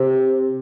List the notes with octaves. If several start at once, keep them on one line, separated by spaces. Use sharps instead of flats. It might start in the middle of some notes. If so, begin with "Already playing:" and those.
Already playing: C3